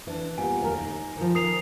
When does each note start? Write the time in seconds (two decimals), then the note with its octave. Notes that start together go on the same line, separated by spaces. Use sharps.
0.07 E3 D4
0.38 A#2 G3 B3 G#5
0.61 D#2 A#4
0.78 D#4
1.16 D#3 F3
1.35 A#4 D#6 C7 F7